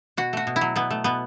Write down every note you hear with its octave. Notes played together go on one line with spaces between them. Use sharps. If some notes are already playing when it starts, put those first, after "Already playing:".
B2 F#4
A3 F#4
B2
E4
F#3
B2 B3
A3
B2 B3